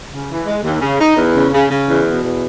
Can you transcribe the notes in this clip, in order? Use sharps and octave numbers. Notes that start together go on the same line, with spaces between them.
C#3
E3
G#3
D#2
C#3
D#4
E2
C#3
C#3
C#3
E2
B2
E2